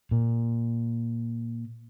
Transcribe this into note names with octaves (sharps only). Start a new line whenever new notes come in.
A#2